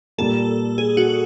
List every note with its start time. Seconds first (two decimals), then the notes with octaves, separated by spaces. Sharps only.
0.18 A#2 G3 A#3 A4
0.78 G#4
0.97 F#4